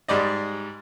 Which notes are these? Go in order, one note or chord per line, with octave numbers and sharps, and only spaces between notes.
G#2 G3 D5 D#5